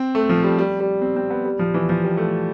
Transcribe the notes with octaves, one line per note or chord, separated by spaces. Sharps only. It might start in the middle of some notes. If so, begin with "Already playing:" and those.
Already playing: C4
A3
F3
G3
G3
G3
C4
C4
B3
G3
F3
E3
F3
G3
A3